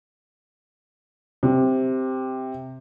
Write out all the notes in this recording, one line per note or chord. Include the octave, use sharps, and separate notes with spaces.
C3